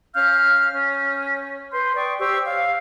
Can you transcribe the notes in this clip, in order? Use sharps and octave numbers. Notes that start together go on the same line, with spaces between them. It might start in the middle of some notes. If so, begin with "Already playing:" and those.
C#4 F5 F6 G6
C#4
B4 C6 G6
D5 G5 C#6 D#6
G4 C5 C#6 E6
C#5 F5